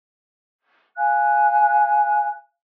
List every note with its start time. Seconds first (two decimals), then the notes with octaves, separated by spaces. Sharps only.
0.97 F5 G#5 F#6